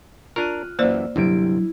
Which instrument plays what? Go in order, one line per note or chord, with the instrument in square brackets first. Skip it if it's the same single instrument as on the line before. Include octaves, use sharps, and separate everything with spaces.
[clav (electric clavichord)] D4 A#4 [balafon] F4 [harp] F6 F#6 D#7
[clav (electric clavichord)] F#2 E3 [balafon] A#3 C5 D5 [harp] E6
[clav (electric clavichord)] G1 C3 G3 [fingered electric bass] F#3 D4 [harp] E4 D7